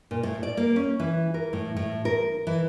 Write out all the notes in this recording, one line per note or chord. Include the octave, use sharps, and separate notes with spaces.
A#2
A2
D5
A#3
C#4
E3
A#4
A2
A2
A#4
E3